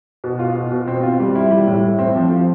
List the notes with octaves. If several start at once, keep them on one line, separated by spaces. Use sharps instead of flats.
B2
F4
B2
B2
C4
F4
G3
E4
G3
A2
A3
C4
F3
F4